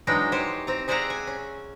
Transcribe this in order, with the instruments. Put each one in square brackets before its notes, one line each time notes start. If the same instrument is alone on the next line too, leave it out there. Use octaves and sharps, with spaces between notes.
[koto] E3 F#3 G#3 D4 D#4 G5
G4 C5 C#5
C4 A#5
G#4 C5 D5 E5 F#5 A#5
G#5
C#4